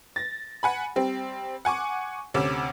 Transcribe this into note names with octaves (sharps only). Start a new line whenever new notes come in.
A6 A#6
F#5 G#5 B5
G3 C4
F#5 G#5 C#6 D6
D2 C3 C#4 D6 E6 E7